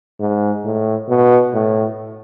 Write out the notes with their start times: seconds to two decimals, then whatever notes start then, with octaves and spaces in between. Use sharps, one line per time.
0.20 G#2
0.65 A2
1.09 B2
1.53 A2